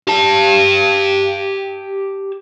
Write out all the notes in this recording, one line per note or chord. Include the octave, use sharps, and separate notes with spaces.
G4 A5